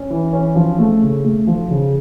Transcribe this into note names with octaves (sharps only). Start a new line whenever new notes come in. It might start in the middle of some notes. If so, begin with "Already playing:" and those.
Already playing: C#4
E3
C#4
F3
A3
C#3
A3
F3
C#3